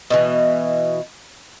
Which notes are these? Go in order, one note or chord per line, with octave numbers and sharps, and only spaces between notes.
B2 D3 E3